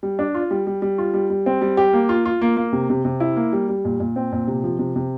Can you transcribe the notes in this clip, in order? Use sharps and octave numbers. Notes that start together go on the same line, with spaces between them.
G3
D4
F4
G3
G3
G3
F4
G3
G3
C4
G3
G4
A#3
F4
F4
A#3
A#3
C3
C3
C3
E4
A#3
G3
G3
A#2
A#2
C4
A#2
C3
F3
C3
C3